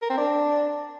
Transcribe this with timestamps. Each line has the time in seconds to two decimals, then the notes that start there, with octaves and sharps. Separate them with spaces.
0.02 A#4
0.10 C4
0.18 D4